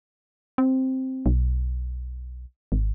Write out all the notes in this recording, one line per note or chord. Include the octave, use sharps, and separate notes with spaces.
C4
B1
G#1